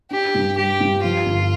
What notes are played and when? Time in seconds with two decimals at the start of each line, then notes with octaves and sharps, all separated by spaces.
0.11 D4 G4
0.35 G2
0.56 G3 G4
0.80 G2
1.03 F3 F4
1.26 G1